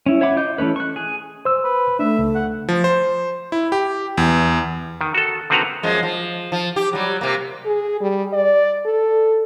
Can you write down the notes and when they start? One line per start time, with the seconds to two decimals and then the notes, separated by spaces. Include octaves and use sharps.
0.06 C#4 E4
0.21 C#5 E5 F#5 B5 D6
0.37 F4 D#5 D6 G6
0.58 E3 A3 C#4 B4
0.76 C#6 F#6
0.96 G#4
1.45 C5 E6
1.64 B4
1.99 A3 D4 E5
2.19 C#2
2.35 F#5
2.69 F3
2.84 C5
3.52 E4
3.72 G4
4.18 E2
5.01 D#3
5.14 F#4 A4
5.50 D3 D#3 C4 F#4 B4 A#5
5.83 F#2 F3 G#3
6.03 F3
6.52 F3
6.76 G4
6.93 F#3 G3
7.21 C3 A#3
7.65 G#4
8.01 G3
8.33 D5
8.85 A4